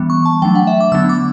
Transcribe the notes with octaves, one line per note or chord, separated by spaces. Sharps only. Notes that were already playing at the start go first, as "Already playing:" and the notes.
Already playing: E3 G3 B3
C#6
A5
F#3 A3 D4 G5
F#5
E5
D6
D3 F#3 B3 D4 E6
D6